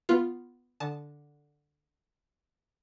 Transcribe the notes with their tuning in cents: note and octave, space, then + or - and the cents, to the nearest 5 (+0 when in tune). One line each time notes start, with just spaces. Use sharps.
B3 +0 F4 +0
D3 +0 A5 -15 D#6 -15